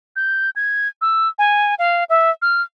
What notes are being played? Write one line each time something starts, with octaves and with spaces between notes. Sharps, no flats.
G6
G#6
E6
G#5
F5
E5
F6